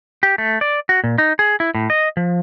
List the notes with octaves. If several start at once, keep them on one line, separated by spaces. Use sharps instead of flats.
G4
A3
D5
F#4
A#2
D#4
G#4
E4
A2
D#5
F3